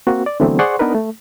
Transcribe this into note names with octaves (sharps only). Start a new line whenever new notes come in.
A#3 C4 F#4
D5
D3 E3 F#3 A3 B3 C4
G#4 C5 D5 F#5 C6 C#6
B3 D4 D#4 A#4 B4
A3